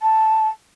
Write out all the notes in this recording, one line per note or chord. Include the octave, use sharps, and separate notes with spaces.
A5